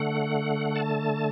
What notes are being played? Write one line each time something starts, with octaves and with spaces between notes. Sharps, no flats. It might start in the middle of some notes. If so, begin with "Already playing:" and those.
Already playing: D3 A3 F#5
A5